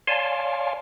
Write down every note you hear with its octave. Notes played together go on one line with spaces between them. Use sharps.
C#5 D5 F5 G#5 A5 C6